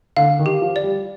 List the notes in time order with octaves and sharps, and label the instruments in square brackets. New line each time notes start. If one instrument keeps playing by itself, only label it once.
[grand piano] D3 [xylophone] F5
[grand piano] D#3
[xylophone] G4
[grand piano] F3
[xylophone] D5
[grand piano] G3